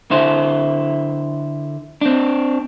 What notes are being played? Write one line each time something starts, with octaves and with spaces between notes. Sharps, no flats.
D3 E4 C5
C4 D4